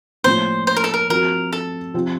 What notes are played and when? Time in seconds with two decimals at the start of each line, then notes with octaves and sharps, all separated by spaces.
0.24 A2 F3 A#3 C#4 F4 C5
0.67 C5
0.76 A#4
0.84 A4
0.94 A#4
1.09 F3 C4 F#4 A#4
1.53 A4
1.94 C3 F3 C4 F4